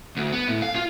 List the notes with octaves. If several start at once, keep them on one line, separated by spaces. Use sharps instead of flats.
D2
B3
A2
F5
F4